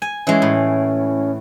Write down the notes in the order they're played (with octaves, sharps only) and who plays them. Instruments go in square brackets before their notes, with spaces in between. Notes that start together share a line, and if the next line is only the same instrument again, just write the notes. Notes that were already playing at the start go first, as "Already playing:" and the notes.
[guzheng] G#5
[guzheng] E3 G#3 [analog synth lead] C#4
[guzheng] A2